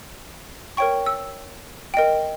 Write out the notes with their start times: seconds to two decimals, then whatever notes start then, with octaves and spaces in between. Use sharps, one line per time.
0.77 A#4 C#5 G5 C#6
1.06 E6
1.94 A#4 D#5 G5